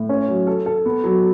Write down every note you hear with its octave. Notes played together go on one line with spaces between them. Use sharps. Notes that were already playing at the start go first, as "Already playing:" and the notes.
Already playing: A2
C#4
F#3
A4
A4
B3
F#3